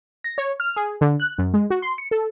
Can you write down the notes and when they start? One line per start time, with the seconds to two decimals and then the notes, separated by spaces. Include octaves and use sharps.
0.24 A#6
0.38 C#5
0.60 F6
0.76 G#4
1.01 D3
1.20 F#6
1.38 F#2
1.54 G#3
1.70 F#4
1.82 C6
1.98 C#7
2.11 A4